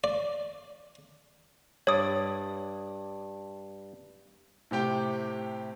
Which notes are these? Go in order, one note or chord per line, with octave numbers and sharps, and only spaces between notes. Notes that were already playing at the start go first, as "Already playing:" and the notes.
D5
G2 C#5 D5 D#6
A2 C3 G4 G5